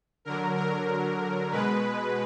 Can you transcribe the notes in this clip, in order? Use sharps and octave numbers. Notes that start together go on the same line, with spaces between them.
D3 F#3 A#4
A#4
B2 G#3 B4